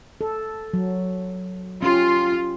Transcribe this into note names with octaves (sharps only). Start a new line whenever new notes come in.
A4
F#3
C#4 F4 G4